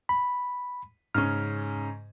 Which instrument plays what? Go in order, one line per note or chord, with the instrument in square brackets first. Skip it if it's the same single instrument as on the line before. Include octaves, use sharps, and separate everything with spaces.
[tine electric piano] B5
[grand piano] G#2 C#3 C#4 [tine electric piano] F6